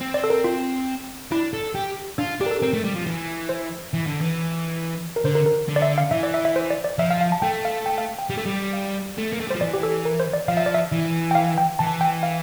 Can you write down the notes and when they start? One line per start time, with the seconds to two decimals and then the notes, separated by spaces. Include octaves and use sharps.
0.01 C4
0.14 D5
0.24 A4
0.30 A#4
0.44 F4
1.31 D4 E4
1.54 A4
1.75 G4
2.18 D4 F4
2.40 D4 G4
2.46 A#4
2.51 A4
2.62 C4 A#4
2.73 A3
2.84 G3
2.95 F3
3.06 E3
3.49 C5
3.94 E3
4.07 D3
4.21 E3
5.16 A#4
5.25 D3 C5
5.35 A#4
5.46 A#4
5.68 D3
5.76 D5
5.82 E5
5.98 F5
6.11 E3 E5
6.23 D5
6.34 E5
6.45 E5
6.56 C5
6.70 D5
6.84 D5
6.98 F3 E5
7.11 F5
7.21 F5
7.32 A5
7.42 A3 G5
7.65 F5
7.86 G5
7.98 F5
8.19 G5
8.30 G3
8.38 A3
8.46 G3
8.73 F5
9.18 A3
9.32 A#3
9.40 A3
9.47 G3
9.50 F3 C5
9.61 E3 D5
9.73 G4
9.83 A4
10.05 A#4
10.20 C5
10.33 D5
10.48 F3 F5
10.57 E5
10.66 D5
10.74 E5
10.92 E3
11.31 G5
11.35 F5
11.58 G5
11.79 E3 A5
12.01 G5
12.23 F5